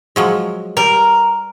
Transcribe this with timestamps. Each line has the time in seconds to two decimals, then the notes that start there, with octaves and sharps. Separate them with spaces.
0.16 F3 F#3 G#3
0.77 G3 A#4